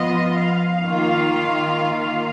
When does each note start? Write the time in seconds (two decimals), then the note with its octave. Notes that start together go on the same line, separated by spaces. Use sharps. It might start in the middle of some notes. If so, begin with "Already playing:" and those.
Already playing: F3 B3 F4 D#5
0.35 F5
0.82 D#3 A#3 F4